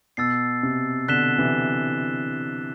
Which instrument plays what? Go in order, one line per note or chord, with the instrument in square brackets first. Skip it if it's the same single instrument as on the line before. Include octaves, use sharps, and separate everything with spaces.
[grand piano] B2 [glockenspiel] E6 A6 C7
[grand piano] C3
[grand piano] B2 D3 [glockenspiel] F#6 B6 E7 G7
[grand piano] C3 E3